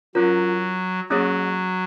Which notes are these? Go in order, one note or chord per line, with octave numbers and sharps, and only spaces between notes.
F#3 C#4 F4 A#4 C#5
F#3 A#3 C#4 G#4 C#5